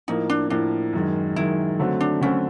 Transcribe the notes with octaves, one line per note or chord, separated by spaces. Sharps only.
A2 F3 A#3 D#4
D4
A2 F3 A#3 D4
F#2 D#3 G#3
F#2 D#3 G#3 E4
D3 F#3 A3 C4
D4
D3 F#3 A3 C4 C#4